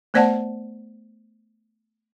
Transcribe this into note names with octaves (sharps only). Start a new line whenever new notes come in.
A3 B3 C5 D5 F#5 A5